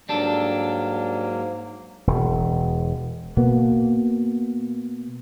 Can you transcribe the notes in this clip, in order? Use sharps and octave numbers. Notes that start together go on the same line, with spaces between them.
G#2 F#3 G3 A#3 D4 A4
E1
B2 A#3 B3